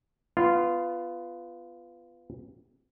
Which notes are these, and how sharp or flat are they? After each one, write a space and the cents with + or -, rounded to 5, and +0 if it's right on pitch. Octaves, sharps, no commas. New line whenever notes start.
B3 +15 F4 -10